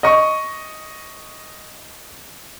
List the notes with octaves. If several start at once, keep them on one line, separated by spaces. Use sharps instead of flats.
D#5 C#6